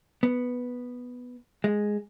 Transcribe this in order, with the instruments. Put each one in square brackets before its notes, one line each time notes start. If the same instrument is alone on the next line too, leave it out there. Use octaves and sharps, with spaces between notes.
[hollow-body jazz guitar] B3
G#3